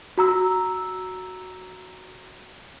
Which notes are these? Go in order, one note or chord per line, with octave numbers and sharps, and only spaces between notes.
F#4 A#5 E6